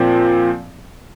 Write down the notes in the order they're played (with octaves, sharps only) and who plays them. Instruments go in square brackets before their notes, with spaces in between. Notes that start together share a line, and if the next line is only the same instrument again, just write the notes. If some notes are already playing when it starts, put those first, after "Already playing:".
Already playing: [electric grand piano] A#2 F3 C4